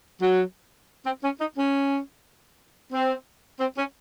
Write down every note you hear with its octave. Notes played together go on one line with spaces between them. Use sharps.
F#3
C4
C#4
D#4
C#4
C4
C4
C#4